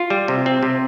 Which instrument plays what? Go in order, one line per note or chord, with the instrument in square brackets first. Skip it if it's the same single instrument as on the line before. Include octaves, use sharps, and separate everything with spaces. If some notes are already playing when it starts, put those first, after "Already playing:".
Already playing: [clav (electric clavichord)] F4
G3
C3
C4
C3